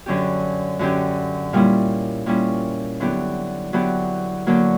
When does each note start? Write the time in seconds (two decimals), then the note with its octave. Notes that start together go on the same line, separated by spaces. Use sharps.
0.06 F#2 D3 F#3 C#4 G4
0.79 F#2 D3 F#3 C#4 G4
1.53 A#2 G3 C#4 E4
2.26 A#2 G3 C#4 E4
3.00 D3 F#3 B3 E4 G4
3.73 D3 F#3 B3 E4 G4
4.46 D3 F#3 A#3